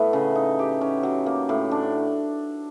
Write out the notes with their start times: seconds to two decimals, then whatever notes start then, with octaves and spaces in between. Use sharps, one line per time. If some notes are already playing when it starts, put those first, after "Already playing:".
Already playing: A2 E3 A3 B3
0.13 C#3
0.35 D#4
0.59 G4
0.81 C#4
1.03 F#3
1.26 A#3
1.49 A2
1.71 D4